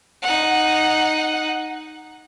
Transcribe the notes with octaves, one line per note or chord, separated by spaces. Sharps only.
D#4 F#5